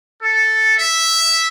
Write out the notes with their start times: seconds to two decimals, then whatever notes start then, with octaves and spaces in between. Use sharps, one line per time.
0.23 A4
0.78 E5